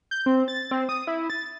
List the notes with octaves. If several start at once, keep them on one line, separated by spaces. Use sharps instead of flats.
G6
C4
A6
C4
D#6
E4
A6